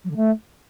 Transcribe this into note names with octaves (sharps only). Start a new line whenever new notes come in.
F#3
D3
A3